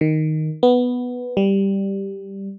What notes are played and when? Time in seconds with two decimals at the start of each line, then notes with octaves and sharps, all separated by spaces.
0.01 D#3
0.63 B3
1.37 G3